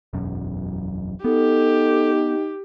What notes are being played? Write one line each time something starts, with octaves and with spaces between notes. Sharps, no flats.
E1 B1 F#2
B3 D#4 G4 A4